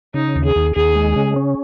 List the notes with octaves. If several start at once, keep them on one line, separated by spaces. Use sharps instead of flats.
C#3 D#4
D#2
G#4
D#2
D#2 G#4
G#3
C#3
C#4